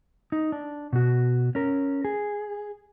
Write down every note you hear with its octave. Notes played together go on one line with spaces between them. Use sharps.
D#4
D4
B2 F#4
C#4 A#4
G#4